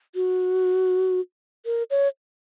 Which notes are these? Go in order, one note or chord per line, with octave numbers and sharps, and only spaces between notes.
F#4
A#4
C#5